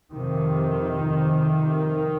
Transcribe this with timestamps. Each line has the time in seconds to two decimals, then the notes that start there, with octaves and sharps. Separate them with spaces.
0.12 F2 C3 D#3
1.03 F2 C3